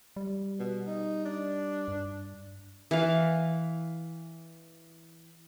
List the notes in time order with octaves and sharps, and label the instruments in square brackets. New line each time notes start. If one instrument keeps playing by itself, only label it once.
[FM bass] G3
[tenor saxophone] B2
D#4
D4
[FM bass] G2
[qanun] E3 F5